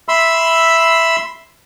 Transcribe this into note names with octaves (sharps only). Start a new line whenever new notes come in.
E5 B5 C6 E6